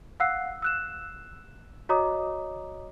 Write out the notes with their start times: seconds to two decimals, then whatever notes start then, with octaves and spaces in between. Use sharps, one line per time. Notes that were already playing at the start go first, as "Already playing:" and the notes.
0.20 F5 F#5 E6 F#6 C7
0.62 E6 F#6 E7
1.89 F#4 C#5 D#5 A#5 D6 D#6